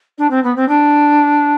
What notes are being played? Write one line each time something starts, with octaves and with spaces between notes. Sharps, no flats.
D4
C4
B3
C4
D4